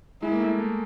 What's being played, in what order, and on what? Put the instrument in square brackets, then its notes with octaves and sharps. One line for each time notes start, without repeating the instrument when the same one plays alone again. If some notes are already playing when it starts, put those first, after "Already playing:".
[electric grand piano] G#3 [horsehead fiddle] E4
[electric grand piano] A#3
A3
A3